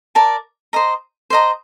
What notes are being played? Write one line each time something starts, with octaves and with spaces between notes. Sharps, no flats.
A#4 D5 A5
C5 D#5 A#5
C5 D#5 A#5